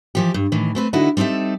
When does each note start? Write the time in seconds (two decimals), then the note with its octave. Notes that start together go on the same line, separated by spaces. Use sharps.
0.15 E3 F3 G4
0.34 G2
0.52 A2 D#3 E3
0.75 A3 C4 B4
0.93 D3 D#4 E4 F#4
1.17 G3 C4 D#4 A4 E5